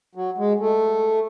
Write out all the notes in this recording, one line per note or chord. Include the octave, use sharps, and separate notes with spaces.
F#3
G#3
A3